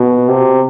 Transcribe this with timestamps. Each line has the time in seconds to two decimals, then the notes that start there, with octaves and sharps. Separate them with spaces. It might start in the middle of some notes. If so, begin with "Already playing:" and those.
Already playing: B2
0.28 C3